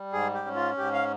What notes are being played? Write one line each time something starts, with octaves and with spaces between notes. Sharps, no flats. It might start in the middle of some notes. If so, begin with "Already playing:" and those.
Already playing: G3
G#2 G#4
G4
C#4
F4
G#2 G4
F5